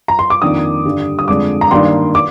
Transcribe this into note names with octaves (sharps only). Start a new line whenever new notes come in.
A#5
C6
D6
F2 D#3 A#3 D4 D#6
G2 D3 G3
D#6
F2 D3 G#3 D4 D6
A#5
G2 D#3 A#3 D4 C6
D6